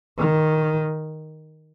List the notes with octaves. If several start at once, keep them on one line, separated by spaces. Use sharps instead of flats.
D#3